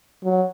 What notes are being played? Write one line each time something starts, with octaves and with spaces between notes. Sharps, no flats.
F#3